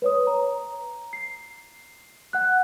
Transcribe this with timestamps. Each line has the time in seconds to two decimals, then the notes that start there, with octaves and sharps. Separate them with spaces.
0.02 B4 C#5 D#6
0.27 A#5
1.13 C7
2.33 F#5 F#6